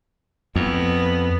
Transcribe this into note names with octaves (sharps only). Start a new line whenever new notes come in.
F2 B3